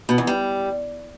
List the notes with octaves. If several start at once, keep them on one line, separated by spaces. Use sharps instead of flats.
B2
E2
G3